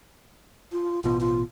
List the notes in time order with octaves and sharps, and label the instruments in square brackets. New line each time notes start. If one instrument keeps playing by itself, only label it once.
[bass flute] F4
[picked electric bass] A1 B2 [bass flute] F4
[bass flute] F4